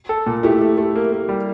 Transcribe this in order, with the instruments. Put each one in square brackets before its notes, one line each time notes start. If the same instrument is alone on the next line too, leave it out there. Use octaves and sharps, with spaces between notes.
[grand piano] A4
A#2
[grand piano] A3 [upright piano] E4 G4
[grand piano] A3
A3
A#3
A#3
G3